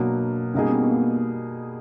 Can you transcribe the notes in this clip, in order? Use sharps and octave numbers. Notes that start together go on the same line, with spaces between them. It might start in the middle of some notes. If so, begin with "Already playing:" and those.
Already playing: B2 F#3 A#3 D4
B2 G3 A#3 C#4 D#4 G#4
C4
B3
B3
A#3